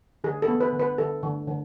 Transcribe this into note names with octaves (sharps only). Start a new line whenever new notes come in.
D3 G#4
A4
B3
B4
D3
B4
D3 A4
D3
D3